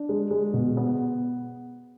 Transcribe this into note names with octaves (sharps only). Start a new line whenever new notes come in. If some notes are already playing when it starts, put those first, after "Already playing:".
Already playing: D4
G#3
G#3
B2
B3